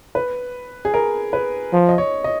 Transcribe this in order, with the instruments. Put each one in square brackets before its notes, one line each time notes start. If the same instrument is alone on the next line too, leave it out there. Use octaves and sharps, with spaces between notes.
[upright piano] B4
G#4
A#4
B4
[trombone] F3
[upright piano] D#5
C#5
D#5